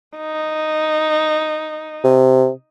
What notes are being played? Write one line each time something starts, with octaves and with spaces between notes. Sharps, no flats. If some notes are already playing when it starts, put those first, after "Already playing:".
D#4
C3